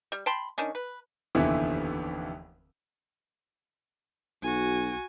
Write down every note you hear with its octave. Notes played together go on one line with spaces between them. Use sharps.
G3
G5 A5 B5 C6
D#3 C#4 D4
B4
F1 D#2 D3 E3 B3 E5
B1 F#4 G#5